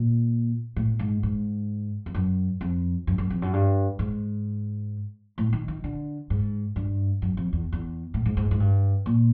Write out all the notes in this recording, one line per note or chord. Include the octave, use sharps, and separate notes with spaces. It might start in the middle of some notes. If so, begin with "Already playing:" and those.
Already playing: A#2
A2
G#2
G#2
F2
F#2
F2
F#2
F#2
F2
F#2
G2
G#2
A2
D#3
D#3
D3
G#2
G2
F#2
F2
E2
E2
A2
G#2
G#2
G#2
G2
A#2